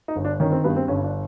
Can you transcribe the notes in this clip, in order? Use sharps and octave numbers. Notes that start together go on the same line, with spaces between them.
D#4
G1
D4
D#3 C#4
C4
G2 B3
C4
G1 C#4
D4